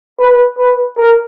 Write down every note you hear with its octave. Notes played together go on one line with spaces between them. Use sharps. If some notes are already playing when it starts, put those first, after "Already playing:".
B4
B4
A#4